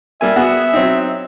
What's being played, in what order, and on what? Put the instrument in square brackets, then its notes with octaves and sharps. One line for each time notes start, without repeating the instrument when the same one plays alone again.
[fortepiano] G3 A#3 G#5 [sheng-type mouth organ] E5
[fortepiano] B3 F#4 G#4
F#3 C4 D#4